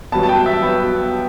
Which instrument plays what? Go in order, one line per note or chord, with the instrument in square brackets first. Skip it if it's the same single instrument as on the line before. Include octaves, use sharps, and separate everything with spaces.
[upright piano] G2 F#3 B3 A5
A5
G5
E5
F#3 B3